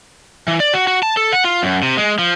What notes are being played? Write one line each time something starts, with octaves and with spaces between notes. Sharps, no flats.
E3
D5
F#4
F#4
A5
A4
F#5
F4
F#2
C3
G#3
F3